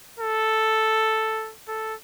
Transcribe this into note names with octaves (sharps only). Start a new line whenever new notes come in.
A4
A4